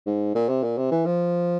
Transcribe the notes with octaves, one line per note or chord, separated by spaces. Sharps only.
G#2
A#2
C3
A#2
C3
E3
F3